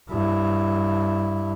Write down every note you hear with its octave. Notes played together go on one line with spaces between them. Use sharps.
G2 E4